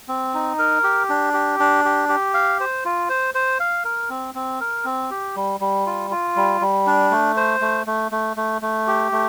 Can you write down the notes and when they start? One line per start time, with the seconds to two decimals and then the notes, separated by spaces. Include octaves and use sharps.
0.08 C4
0.34 D#4
0.59 A#4
0.84 G4
1.09 D4
1.34 G4
1.60 D4
1.85 G4
2.09 G4
2.34 F5
2.60 C5
2.85 F4
3.09 C5
3.34 C5
3.60 F5
3.85 A#4
4.10 C4
4.35 C4
4.60 A#4
4.85 C4
5.11 G4
5.36 G3
5.60 G3
5.87 F4
6.11 F4
6.36 G3
6.61 G3
6.87 D4
7.11 A3
7.37 C5
7.61 A3
7.87 A3
8.12 A3
8.37 A3
8.62 A3
8.87 G4
9.12 A3